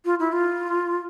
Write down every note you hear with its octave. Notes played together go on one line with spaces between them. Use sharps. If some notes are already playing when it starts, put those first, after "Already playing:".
F4
E4
F4